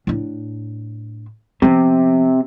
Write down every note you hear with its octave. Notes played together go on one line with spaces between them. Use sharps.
A2 D4
C3 F3 B3